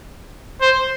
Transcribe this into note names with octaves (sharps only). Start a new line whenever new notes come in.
C5